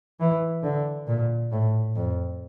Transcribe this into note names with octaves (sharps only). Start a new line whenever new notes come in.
E3
D3
A#2
A2
F2